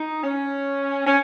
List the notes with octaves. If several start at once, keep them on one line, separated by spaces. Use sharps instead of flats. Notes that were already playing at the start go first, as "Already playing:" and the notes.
Already playing: D#4
C#4
C#4